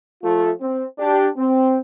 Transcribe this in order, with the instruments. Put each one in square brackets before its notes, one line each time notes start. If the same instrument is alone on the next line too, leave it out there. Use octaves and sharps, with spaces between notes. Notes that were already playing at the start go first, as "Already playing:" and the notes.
[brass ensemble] F3 A3 F4
C4
D4 G4
C4